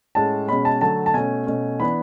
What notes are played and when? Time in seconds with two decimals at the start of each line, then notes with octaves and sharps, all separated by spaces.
0.15 A2 G#3 C#4 A5
0.48 B2 G#3 C#4 B5
0.65 A5
0.81 D3 F#3 A3 A5
1.06 A5
1.14 B2 A3 C#4 G#5
1.47 B2 A3 C#4
1.80 E3 B3 D4 B5